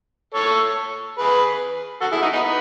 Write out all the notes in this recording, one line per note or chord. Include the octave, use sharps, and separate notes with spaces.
A4 C#5
G#4 B4
F#4 A4
E4 G#4
D#4 F#4
B3 D#4
B3